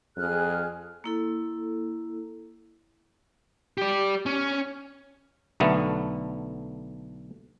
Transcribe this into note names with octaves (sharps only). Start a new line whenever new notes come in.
F2 G#4 F6 F#6
A#3 E4 A4
G4 D5
C#4
B1 D3 A3 B3